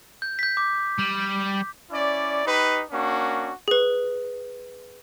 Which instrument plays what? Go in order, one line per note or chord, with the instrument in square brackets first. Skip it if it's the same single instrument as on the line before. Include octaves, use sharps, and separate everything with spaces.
[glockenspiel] G6
G6 B6
D6
[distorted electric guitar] G3
[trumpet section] C#4 E4 D5
D#4 G4 B4
A#3 C#4 D4 F#4
[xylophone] G#4 B4